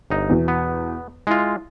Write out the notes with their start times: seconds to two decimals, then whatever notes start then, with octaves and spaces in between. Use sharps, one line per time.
0.10 G1 D#4
0.29 E2 B2 E3
0.48 B3
1.27 G#3 E4 F4